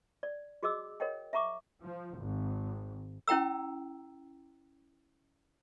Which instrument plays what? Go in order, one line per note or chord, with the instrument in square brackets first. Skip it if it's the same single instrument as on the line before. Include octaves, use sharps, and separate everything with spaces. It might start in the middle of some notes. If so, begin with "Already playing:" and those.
[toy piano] D5
F#4 G#4 D#5 D6 E6
A#4 C#5 D#5 F#5 G5
E5 F#5 A#5 C#6 D6
[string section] F3
G#1
[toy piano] C#4 E4 G5 A#5 E6